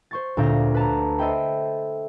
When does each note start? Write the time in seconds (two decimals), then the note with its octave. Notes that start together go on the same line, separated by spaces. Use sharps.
0.11 C5 C#6 A6
0.37 D2 A#2 D4 F5 G6 A#6
0.74 B4 A5 A#5
1.18 A4 C5 D#5 E5 G5 B5